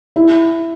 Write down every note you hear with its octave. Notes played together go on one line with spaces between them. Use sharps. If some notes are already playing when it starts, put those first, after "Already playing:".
E4